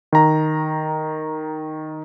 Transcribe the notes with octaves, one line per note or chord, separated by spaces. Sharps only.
D#3 A#5